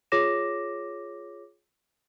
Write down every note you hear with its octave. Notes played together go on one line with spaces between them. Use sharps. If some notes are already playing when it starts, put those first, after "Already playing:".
F4 G#4 C#5 D6 A#6 E7